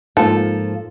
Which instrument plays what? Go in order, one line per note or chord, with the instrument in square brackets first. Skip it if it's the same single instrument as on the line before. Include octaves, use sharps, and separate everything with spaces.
[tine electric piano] G#2 [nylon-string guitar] F3 A#3 F4 [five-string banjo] A4